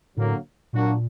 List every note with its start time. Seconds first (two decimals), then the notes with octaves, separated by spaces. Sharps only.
0.17 A2 D3 F#3 A#3
0.73 A#2 F#3 A#3 D4 F#4